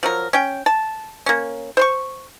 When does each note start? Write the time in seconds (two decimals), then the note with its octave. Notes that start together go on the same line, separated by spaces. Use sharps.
0.03 F3 F#3 A#4
0.33 C#4 G5
0.66 A5
1.26 A#3 C#4
1.77 C5 C6 C#6